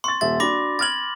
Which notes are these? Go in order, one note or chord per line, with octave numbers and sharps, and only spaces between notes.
C6 C#6 A6
D#1 E5 A6
D4 F#4 B5 D6 A#6
D6 F6 G#6 A6 F#7